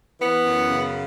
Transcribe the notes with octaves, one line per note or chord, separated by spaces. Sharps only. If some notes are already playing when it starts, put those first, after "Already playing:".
E3 B3
F#2
C#3